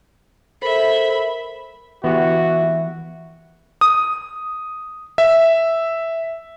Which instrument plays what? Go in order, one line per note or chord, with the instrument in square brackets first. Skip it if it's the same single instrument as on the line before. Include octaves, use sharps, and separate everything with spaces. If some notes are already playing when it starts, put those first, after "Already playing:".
[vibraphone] A4 A#4 C5 [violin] E5 B5
[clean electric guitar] E3 [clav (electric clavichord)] B3 G4 [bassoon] E4 [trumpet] F#4
[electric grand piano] D#6
E5